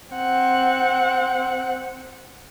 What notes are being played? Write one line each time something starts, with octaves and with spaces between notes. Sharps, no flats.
C4 F#5